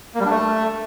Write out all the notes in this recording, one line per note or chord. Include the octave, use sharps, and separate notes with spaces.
A#3
G3
D4
A3